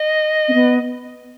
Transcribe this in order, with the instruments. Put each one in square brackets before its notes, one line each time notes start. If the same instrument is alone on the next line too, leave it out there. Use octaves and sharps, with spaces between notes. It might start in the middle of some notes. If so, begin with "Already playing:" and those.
Already playing: [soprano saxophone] D#5
[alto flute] C4
B3